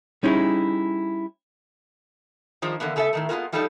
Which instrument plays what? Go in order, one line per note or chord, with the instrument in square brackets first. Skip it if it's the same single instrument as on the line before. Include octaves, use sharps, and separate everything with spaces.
[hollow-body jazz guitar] G3 C#4 D#4 E4 G#4
[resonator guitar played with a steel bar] D#3 F3 G#3 D4
D3 E3 A#3 B3
C#3 B3 A4 D#5 E5
A2 D#3 A3
G#3 A#3 B3 F4 F#4 A#4
F3 G3 A3 D4 D#4 A4